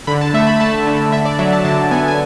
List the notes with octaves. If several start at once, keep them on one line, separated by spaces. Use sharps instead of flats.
D3 B5
A5
A3 E5
B5
A3 A5
D3
D3 E5
D5
F#3 E5
A5
D3 A5
B3 G#5
G#5